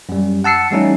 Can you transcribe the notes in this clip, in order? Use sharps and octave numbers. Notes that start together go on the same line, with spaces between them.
F#2 G3
F#5 A5 E6 C7 C#7
E3 G3 A3 C#4 D#4 E4